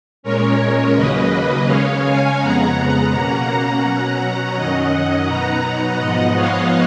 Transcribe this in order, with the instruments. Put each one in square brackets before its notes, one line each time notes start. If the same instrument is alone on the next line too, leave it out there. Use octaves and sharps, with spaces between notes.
[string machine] A#2 G#3 C#4 A#4 C#5
D#2 C#3 F#3 A#3 B4 D#5
C#3 G#3 C#4 C#5 F5
F5 G#5
F2 C#3 G#3 B3 F#5 A#5
B2 A#3 C#4
B2 F#3 C#4 F#5 A#5
F#2 D#3 F#3 C#4 D#5 F#5
B2 F#3 B3 D#4 F#5 A#5
G#2 F3 B3 D#5 F#5
C#5 F5